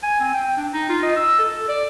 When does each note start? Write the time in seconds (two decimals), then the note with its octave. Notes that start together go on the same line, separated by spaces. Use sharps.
0.03 G#5
0.20 C4
0.34 G5
0.57 D4
0.73 D#4
0.89 F4
1.03 D#5
1.16 E6
1.39 A4
1.68 D5